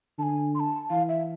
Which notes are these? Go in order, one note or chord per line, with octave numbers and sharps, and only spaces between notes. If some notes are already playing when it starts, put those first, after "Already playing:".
D3 G#5 A5
C6
A5
E3 F5
E5